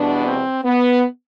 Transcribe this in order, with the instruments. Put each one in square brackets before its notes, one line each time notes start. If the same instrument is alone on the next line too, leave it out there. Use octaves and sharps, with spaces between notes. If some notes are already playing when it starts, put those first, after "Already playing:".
Already playing: [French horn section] E2 B2 G3 B3 D4
C4
B3